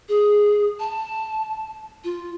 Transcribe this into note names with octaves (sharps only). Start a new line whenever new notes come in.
G#4
A5
F4